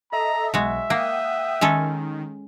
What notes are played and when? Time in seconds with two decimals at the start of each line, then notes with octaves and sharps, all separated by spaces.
0.12 A4 D#5 E5 A#5
0.54 B1 G#3 F#4 E5
0.90 A#3 F#5 G5 D#6
1.61 D#3 G#3 C#4 A4